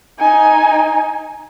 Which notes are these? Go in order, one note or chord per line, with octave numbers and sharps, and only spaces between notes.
D#4 G#5